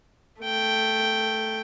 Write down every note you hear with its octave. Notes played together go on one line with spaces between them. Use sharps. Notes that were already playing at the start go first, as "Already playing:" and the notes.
A3 G5